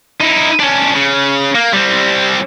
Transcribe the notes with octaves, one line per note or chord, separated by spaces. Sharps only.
D#4 E4
C#4 D4
C#3
A#3
G3 C4